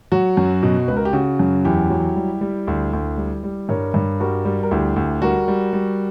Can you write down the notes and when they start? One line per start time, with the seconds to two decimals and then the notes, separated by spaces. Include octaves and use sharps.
0.12 F#3 F#4
0.37 F#2
0.63 B2
0.88 C#2 B4
0.97 A#4
1.05 G4
1.13 C#3 F#4
1.39 F#2
1.65 E2 E4 G4
1.90 F#3
2.16 G3
2.41 G3
2.67 D2
2.93 D2
3.17 G3
3.43 G3
3.69 G2 A#4 C#5
3.94 G2
4.20 G3 F#4 A#4
4.45 G3
4.63 A#4
4.71 D2 E4 G4
4.96 D2
5.22 G3 F#4 A#4
5.48 G3
5.73 G3